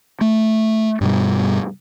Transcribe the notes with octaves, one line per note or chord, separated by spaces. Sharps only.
A3
G2 B2 G3